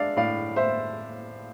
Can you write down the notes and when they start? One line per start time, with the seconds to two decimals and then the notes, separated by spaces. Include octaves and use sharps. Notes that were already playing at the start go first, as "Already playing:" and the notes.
Already playing: G#3 D4 D5 E5 F5
0.16 A2 D5 F5
0.56 A2 C5 E5